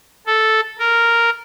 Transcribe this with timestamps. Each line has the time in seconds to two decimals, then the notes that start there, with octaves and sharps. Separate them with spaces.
0.26 A4
0.79 A#4